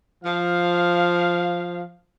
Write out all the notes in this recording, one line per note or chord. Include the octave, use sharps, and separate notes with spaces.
F3 F5